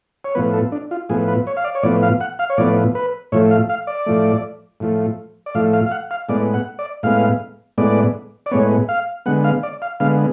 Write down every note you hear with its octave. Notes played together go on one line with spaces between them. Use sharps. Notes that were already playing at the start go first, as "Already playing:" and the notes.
C#5
A2 F3 B3 B4
A4
D4
F4
A2 F3 B3 G#4
B4
C#5
F5
D5
C#5
A2 F3 B3 D5
F5
F#5
F5
C#5
A2 F3 B3 D5
B4
A2 F3 A3 C#5
F5
F5
D5
A2 F3 A3
A2 F3 A3
D5
A2 F3 A3 F5
F5
F5
F#5
F5
A2 G#3 B3 D5
F#5
D5
A2 G#3 B3 F5
A2 G#3 B3 D5
D5
A2 G#3 B3 C#5
F5
D3 G#3 B3 F#5
F5
D5
F5
D3 G#3 B3 F5